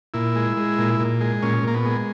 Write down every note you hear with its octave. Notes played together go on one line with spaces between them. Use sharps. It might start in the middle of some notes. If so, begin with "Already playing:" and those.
A#2 E4
G#3
G#3
A#2
A#2
G#3
A#2 C#4
A#2 A#3
B3
G#3